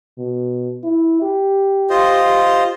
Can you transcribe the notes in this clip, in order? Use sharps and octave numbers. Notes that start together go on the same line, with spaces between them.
B2
E4
G4
F4 C5 D#5